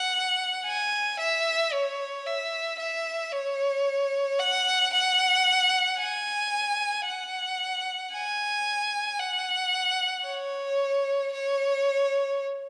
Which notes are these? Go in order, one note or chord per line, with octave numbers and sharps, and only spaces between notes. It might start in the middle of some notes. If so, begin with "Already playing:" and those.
Already playing: F#5
G#5
E5
C#5
E5
E5
C#5
F#5
F#5
G#5
F#5
G#5
F#5
C#5
C#5